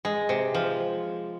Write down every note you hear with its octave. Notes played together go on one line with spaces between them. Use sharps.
G#3
C3
F3